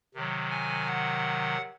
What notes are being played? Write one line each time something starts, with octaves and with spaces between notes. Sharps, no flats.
C3 D#3 F#3
G#5
F#5